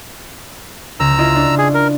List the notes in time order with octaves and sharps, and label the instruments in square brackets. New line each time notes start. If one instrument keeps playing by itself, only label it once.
[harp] C#2 [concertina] A#5 E6
[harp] E4 F4 D#5
D4
[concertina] G#4
A#4